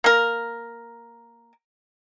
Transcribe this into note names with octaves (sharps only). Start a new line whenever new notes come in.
A#3 A#4